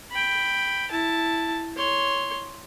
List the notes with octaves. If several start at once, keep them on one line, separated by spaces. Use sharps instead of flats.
G5 B5
E4 A5
C#5 C6